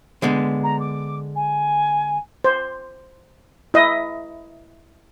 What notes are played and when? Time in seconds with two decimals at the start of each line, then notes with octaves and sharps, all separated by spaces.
0.22 D3 G#3 B3
0.63 A#5
0.80 D6
1.35 G#5
2.44 C5
3.74 E4 D#5